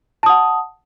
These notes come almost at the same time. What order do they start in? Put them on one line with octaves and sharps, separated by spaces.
A5 D#6 F#5